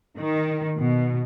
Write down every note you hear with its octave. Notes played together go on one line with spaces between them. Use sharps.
D#3
B2